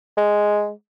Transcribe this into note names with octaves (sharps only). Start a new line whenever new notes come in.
G#3